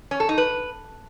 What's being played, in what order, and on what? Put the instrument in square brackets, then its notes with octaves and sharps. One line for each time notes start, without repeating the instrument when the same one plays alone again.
[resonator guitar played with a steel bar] C#4
A4
D#4
B4